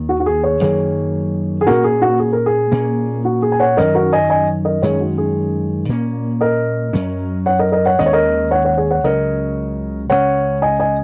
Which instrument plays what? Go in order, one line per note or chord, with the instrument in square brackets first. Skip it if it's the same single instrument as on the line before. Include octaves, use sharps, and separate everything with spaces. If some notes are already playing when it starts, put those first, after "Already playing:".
Already playing: [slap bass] D#2 D#3 A#3
[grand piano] F#4
F#4
G#4
G#4 C#5
[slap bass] F#2 D#3 F#3 A#3 [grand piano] G#4 C#5
[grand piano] G#4
[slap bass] A#2 A#3 C#4 [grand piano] F#4 A#4
[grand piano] G#4
F#4
G#4
A#4
G#4
[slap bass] A#2 A#3 C#4
[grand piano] F#4
G#4
G#5
C#5 F#5
[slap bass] F#2 D#3 F#3 C#4 [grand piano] A#4 D#5
[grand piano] F#4 A#4
D#5 G#5
D#5 G#5
A#4 D#5
[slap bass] F#2 D#3 G#3 C#4 [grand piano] G#4 C#5
[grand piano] F#4
G#4
[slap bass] A#2 A#3 C#4
[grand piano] A#4 D#5
[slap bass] F#2 F#3 C#4
[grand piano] C#5 F#5
A#4 D#5
A#4 D#5
C#5 F#5
[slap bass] D#2 D#3 G#3 C#4 [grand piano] D#5
[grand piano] C#5
A#4 D#5
C#5 F#5
C#5 F#5
G#4 C#5
C#5 F#5
[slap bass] C#2 C#3 F#3 C#4 [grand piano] A#4 D#5
[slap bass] C#2 C#3 G#3 C#4 [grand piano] C#5 F#5
[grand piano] D#5 G#5
D#5 G#5